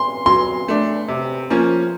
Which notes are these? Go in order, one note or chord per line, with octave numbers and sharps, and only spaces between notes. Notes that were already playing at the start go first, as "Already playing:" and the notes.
Already playing: C6
F#3 C6
A3 D4
C3
F3 A#3 C#4